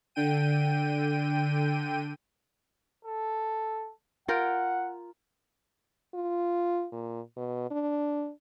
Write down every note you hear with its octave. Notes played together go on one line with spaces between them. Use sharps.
D3 G5 D#7
A4
F4 A#4 F#5 G5
F4
A#2
B2
D4